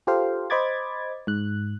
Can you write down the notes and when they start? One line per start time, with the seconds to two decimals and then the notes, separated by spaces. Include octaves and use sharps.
0.07 F4 G4 A4 C5 F5
0.50 C5 D#5 B5 D6 G#6 A6
1.27 G#2 F#6